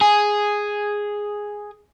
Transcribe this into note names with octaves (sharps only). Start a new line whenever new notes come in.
G#4 G#5